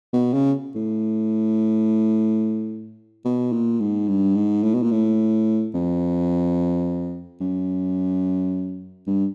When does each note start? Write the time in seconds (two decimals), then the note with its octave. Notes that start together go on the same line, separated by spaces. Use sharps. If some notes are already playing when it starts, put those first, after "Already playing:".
0.13 B2
0.34 C#3
0.75 A2
3.25 B2
3.53 A#2
3.80 G#2
4.08 G2
4.35 G#2
4.63 A2
4.75 B2
4.83 A#2
4.91 A2
5.74 F2
7.41 F#2
9.07 G2